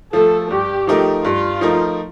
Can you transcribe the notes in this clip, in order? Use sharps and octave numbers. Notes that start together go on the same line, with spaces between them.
F3 A3 A4
G2 G4
F3 A3 D#4 A#4
G2 F4
F3 A3 D#4 A#4